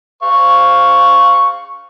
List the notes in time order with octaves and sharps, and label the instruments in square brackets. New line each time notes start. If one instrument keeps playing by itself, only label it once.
[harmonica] C5 F5 C#6